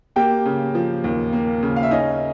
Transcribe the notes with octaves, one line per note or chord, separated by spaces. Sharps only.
A#3 G4 G5
C#3
F3
D#2
A#3
C#3
F5
E5
C#4 D#4 D#5